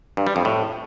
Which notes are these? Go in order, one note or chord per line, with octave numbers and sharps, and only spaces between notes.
G2
G3
F2
A2